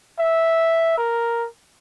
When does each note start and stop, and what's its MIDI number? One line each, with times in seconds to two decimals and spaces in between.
0.19 0.95 76
0.98 1.47 70